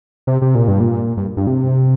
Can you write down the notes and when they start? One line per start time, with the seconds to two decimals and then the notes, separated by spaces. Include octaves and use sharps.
0.27 C3
0.42 C3
0.55 A#2
0.68 G2
0.80 A#2
1.17 G2
1.37 G2
1.47 C3